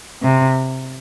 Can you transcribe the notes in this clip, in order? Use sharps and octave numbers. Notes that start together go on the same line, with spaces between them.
C3